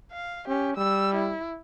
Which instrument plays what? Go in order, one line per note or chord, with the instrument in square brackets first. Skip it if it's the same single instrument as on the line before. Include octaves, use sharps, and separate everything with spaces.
[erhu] F5
[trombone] C#4 [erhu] G4
[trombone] G3 [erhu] E6
[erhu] E4